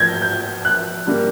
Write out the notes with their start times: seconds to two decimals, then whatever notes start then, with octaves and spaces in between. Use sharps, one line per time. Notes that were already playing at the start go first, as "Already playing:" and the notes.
Already playing: F3 G6 G#6 A#6
0.22 G6
0.65 F#6
1.06 D3 G3 A#3